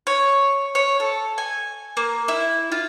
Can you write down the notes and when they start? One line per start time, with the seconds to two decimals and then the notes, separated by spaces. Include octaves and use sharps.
0.07 C#5
0.75 C#5
1.00 A4
1.38 G#5
1.97 A#3
2.28 E4
2.72 F4